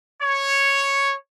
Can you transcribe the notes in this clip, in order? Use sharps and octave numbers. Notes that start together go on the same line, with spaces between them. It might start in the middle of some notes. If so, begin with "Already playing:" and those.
C#5